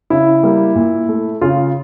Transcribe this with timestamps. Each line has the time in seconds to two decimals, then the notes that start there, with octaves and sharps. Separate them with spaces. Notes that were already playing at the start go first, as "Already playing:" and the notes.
0.10 C#3 E4
0.43 G3 A#3
0.75 A#2
1.09 A3
1.41 C#3 F4